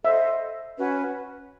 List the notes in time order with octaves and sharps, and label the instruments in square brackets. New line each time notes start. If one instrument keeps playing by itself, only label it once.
[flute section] A4 C5 D#5 F#5 [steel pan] E5
[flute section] C#4 F#4 B4